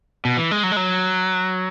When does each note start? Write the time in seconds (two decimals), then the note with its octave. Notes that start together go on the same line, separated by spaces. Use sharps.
0.25 B2
0.37 E3
0.51 G#3
0.63 F#3
0.72 G#3
0.76 F#3